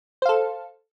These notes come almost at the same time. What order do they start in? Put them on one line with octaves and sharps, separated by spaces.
C5 F5 A4